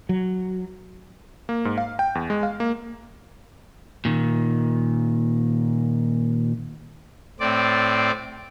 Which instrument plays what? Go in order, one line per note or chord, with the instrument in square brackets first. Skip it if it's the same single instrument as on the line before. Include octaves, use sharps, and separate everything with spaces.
[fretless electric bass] F#3
[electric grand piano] A#3
G#2
F5
G5
E2
G#3
F5
A#3
[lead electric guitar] A#2 D#3
[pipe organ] A2 C4 D5